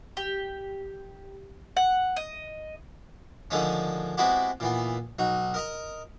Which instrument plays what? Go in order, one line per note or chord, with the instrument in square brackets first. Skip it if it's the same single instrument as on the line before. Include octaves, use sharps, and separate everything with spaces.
[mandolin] G4
F#5
D#5
[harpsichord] D3 D#3 F3 G#3 A3 C#4
G#3 B3 C4 E4 F#4 G4
A#2 E3 B3
B1 D#4 F#4
A#4 D#5 A#5